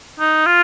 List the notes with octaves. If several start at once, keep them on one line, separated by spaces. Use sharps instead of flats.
D#4
F4